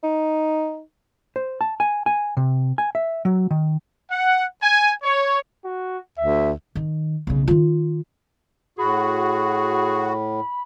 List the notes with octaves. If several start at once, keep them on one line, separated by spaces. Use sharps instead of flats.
D#4
C5
A5
G#5
G#5
C3
G#5
E5
F#3
D#3
F#5
G#5
C#5
F#4
D2 E5
D#3
B1 C#3
D#3 F4
A2 F#4 G#4 B5